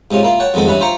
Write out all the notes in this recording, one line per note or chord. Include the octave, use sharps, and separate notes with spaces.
G#2 C3 C#4 F4
A#3 E4 F4
C#5 F#5 G5 A5
F2 D#3 G#3 B3 C4 A4
G2 E3 C#4 B4 E5
F4 C5 E5 G5 A#5 C#6